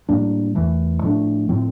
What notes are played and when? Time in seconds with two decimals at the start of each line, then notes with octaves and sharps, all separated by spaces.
0.09 A2 G3 A#3 D4
0.55 E2 E3 A3
1.03 A2 F3 A3 D4
1.49 A2 F3 C4